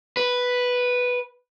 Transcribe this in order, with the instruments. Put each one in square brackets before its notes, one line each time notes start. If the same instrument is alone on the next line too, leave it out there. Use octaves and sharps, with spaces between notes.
[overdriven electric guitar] B4